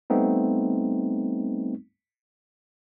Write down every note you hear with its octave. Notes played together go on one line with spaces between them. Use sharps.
G3 A3 B3 C4 D#4